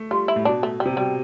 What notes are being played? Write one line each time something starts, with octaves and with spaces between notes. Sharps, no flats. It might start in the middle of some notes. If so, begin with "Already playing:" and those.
Already playing: A3
G3 F4
E4
A2
B2 D4
A3
G3
C3
B2
G3